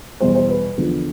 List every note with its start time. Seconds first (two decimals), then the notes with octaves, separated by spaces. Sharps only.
0.20 E2 B2 G3 C5
0.35 C5
0.49 B4
0.77 E2 D3 F3